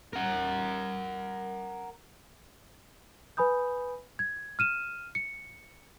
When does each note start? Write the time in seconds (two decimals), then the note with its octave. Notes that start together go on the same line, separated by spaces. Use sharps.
0.13 A#4 F#5
3.37 B4 G#5 B5 D#6 G6
4.19 G#6
4.59 F6 D#7 E7
5.15 C#7